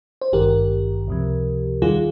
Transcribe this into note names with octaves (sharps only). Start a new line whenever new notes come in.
C5
G#1 G2 D#3 G4 A#4
C#2 C3 F3
D#2 D#3 G3 F4 G#4